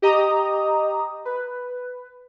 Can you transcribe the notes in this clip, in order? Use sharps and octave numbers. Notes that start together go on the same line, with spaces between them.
G4 D#5 A#5 D#6
B4